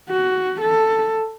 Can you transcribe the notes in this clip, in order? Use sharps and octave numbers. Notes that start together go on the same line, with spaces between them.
F#4
A4